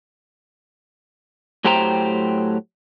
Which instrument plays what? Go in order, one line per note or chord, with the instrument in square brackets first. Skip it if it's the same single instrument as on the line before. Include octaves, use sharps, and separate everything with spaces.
[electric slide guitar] A2 F#3 G4 C5 G5 A#5